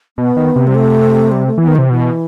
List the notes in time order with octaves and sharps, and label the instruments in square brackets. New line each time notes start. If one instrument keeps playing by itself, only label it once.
[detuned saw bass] B2 [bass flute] B3
[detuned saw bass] D#3
C3
[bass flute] G3
A3
G3
A3
[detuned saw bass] E3 [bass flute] B3
[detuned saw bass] D#3
[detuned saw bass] C3 [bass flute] E3
[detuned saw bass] B2 [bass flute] E3